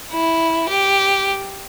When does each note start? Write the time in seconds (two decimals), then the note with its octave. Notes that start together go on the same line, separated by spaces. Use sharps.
0.12 E4
0.69 G4